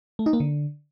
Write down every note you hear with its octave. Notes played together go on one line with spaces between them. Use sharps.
A3
D#4
A#3
D3